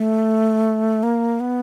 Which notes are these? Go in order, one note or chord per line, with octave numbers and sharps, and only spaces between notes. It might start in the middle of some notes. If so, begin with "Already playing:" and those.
Already playing: A3
A#3
B3